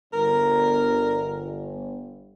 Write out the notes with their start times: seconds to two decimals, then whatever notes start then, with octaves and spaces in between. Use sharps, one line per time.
0.13 G1 A#4